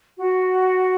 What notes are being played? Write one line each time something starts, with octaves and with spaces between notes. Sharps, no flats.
F#4